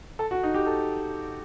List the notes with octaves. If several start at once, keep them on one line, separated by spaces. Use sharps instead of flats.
A4
F#4
D#4
G4
A4